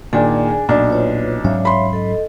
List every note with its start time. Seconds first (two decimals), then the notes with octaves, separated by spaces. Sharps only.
0.13 A#2 D#3 D4 G#4 G#5
0.69 B1 A#2 D4
0.90 F4 B4 C#5
1.45 G#2 F#3 C#4 C#5 E5 F5
1.65 B5 C6
1.93 A4 D#5